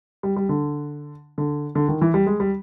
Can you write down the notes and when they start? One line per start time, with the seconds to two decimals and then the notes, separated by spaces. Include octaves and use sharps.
0.23 G3
0.36 G3
0.49 D3
1.38 D3
1.75 D3
1.88 D#3
2.01 E3
2.14 G3
2.26 G#3
2.40 G3